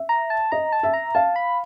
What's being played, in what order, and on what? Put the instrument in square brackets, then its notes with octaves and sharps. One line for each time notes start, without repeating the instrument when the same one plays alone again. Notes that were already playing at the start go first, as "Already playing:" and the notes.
Already playing: [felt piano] E5
[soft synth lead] A#5
A5
[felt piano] D#5 [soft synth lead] A#5
[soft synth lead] A5
[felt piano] E5
[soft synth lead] A#5
[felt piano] F5 [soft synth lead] A5
[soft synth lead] B5